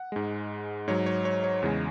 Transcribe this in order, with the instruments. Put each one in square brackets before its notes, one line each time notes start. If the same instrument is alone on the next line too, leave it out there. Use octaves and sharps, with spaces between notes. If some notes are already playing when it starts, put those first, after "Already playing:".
Already playing: [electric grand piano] F#5
G#2 G#3
G#2 F#3 C#5
C#5
C#5
C#5
E2 C#3 G#3